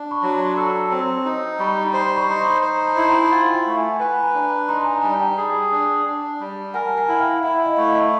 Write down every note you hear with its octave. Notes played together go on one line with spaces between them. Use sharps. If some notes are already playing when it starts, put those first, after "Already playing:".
Already playing: D4
B5 C#6
F#3
A#5 C6
A4 B5 C#6
C4
D#4
G3 B5 C#6
C5 A#5 C6
B5 C#6
D#4
B5 C#6
C5 A#5 C6
C6
A5 B5
E4
G5 A5
F4 F#5 G#5
F5 G5
A3
F#5 G#5
B4 F#5 G#5
G#5 A#5
D4
D#4 A#5 C6
A5
G#5 A#5
G3 G#5 A#5
G5 A5
G#4
D4
D4
G3
A#4 F#5 G#5
A5
F#5 G#5
E4
F5 G5
E4 E5 F#5
D#5 F5
A3
D#5 F5